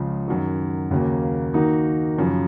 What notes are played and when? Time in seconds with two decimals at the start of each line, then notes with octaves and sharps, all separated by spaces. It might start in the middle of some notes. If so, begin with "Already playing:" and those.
Already playing: C#2 C#3 F3
0.28 F#2 D#3 F#3
0.91 D#2 C#3 F#3 A#3
1.54 D#3 A#3 D#4 F#4
2.18 F#2 C#3 F3